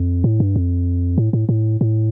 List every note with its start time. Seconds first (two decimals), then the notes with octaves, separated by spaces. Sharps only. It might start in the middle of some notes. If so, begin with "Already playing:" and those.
Already playing: F2
0.24 A2
0.40 G2
0.56 F2
1.18 A2
1.33 A2
1.49 A2
1.81 A2